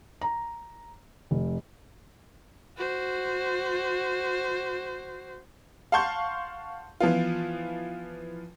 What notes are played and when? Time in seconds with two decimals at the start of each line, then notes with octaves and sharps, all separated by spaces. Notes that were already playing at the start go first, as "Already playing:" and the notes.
0.21 A#5
1.31 F1
2.78 F#4 C5
5.92 F5 F#5 A5 C6 C#6 G6
7.00 E3 F3 B3 F4